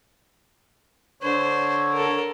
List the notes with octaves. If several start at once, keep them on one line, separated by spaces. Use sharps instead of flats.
D3 C5 C#5
A4 A#4